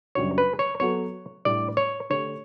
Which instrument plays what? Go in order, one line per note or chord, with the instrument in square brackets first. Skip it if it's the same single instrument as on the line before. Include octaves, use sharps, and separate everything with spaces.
[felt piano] F#2 C#3 G3 D4 F#4 [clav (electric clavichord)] C#5
[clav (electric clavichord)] B4
C#5
[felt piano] F#3 B3 F#4 A4 [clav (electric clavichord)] C#5
[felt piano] A2 G3 D4 G4 [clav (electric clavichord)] D5
[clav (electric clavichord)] C#5
[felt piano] D3 A3 D4 G4 [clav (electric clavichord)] C#5